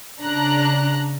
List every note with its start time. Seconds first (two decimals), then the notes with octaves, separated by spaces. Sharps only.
0.21 C#3 D4 A#5 F#6